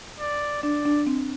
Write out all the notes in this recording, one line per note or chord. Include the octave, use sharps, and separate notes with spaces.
D5
D4 D5
D4
C4